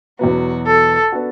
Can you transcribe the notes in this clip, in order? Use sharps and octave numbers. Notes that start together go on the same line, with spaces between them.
E2 B2 F#3 B3 F#4
A4
B3 D4 F#4